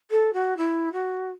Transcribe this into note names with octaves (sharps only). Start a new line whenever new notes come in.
A4
F#4
E4
F#4